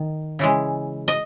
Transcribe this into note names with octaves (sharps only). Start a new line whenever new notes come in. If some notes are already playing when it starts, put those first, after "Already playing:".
Already playing: D#3
C#3 E3 G#3
D#5